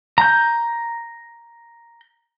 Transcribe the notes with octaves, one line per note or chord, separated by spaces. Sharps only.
A#5 G6